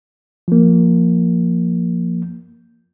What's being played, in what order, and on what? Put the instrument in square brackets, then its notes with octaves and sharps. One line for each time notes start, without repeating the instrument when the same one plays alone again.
[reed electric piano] F3 A#3